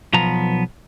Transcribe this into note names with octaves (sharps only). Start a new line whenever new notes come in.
B1 F3 B3 A#5